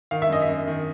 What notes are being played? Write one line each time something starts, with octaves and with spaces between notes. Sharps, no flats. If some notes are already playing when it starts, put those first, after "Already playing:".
D#3 F5
E5
F#2 D#5
E5
F#2
D#3